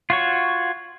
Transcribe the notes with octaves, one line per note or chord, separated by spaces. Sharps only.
F4 F#4 C#5